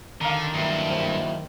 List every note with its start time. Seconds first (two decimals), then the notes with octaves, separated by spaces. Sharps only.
0.21 D3 D#3 F5 A#5
0.54 G2 F#3 A#3 E4
0.90 C5